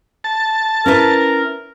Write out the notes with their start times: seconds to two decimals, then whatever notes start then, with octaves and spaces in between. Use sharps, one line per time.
0.24 A5
0.86 C#4 E4 A#4 B4